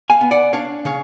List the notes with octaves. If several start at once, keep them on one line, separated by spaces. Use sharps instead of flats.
F5 G#5
B3
D5 F#5
D4 C#5 F5
C#3 C#5 F5